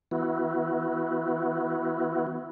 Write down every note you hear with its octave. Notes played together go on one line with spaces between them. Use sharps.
E3 B3 E4 F#4